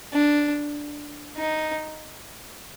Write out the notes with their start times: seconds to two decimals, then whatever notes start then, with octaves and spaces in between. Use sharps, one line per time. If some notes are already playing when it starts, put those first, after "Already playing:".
0.13 D4
1.36 D#4